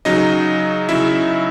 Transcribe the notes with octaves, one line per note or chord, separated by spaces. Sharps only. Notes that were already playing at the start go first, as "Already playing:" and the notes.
C#3 F#3 D#4 D#5
C#3 F#3 E4 E5